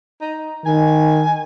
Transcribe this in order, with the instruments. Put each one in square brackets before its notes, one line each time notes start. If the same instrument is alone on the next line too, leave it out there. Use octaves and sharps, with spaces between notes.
[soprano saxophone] D#4
[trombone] D#3 [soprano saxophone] G#5